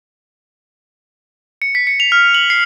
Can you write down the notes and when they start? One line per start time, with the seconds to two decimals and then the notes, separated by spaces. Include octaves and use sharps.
1.62 C#7
1.75 B6
1.87 C#7
2.00 F7
2.12 F6
2.34 F#7
2.50 C7